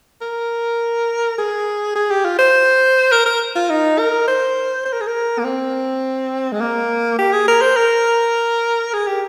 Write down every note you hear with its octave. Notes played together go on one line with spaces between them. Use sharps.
A#4
G#4
G#4
G4
F4
C5
A#4
A#4
F4
D#4
A#4
C5
C5
A#4
G#4
A#4
A#3
C4
G#3
A#3
G4
G#4
A#4
C5
A#4
G#4
G4